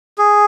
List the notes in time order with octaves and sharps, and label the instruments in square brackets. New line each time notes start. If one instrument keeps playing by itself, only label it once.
[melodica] G#4